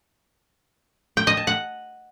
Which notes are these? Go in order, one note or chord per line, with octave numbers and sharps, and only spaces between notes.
G5
D#5
A5
F#5